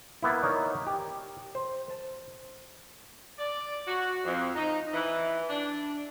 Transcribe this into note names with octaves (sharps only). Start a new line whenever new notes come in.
A#3 B3 E4
D#4 A#4 C#5 D5
G4
C5
A5
D5
F#4
F2
D#4
E3
D4